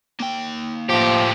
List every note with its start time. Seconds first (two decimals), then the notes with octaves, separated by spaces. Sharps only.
0.20 A#3 G5
0.89 A2 F3 G4